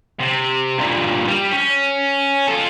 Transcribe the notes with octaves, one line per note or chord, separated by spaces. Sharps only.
C3
G2 A#2
G3
C#4
F4 A4